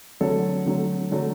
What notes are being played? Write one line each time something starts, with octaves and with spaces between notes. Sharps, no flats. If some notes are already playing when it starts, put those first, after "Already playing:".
D3 F#3 A3 A4
D3 F#3 A3
D3 F#3 A3